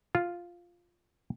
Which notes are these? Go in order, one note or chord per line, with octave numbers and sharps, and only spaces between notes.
F4